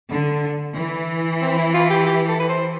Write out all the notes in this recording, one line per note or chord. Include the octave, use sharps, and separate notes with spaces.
D3
E3
C4
E4
F4
G4
G4
A4
B4
C5